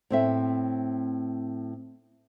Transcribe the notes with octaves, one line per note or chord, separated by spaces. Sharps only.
A2 C4 E5